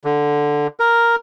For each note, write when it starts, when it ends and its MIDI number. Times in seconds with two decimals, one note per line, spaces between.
0.04 0.67 50
0.80 1.16 70